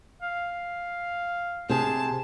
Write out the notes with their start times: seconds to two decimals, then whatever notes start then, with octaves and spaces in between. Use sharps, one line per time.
0.22 F5
1.70 C3 G#4 A5